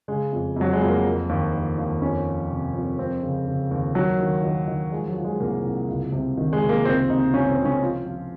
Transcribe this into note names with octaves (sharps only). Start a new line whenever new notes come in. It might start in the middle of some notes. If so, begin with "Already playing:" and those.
C#3 G#3
F2
F2 F#3
G#3
F2
A#3
F3
D#2
D#2
D#2
F2 C#4
F3
C3
F2
F3 C4
C#3
C#3
D#2
D#3 F#3
D#3
D#3
D#3
F3 G#3
F#3
F3
G#3
C2 A#3
C2
C#2
C3
D#3
G#3
C3
A#3
C#2 C4
C3 D#4
C#2 C#4
C4
C#2
C#4
F3 F4
F3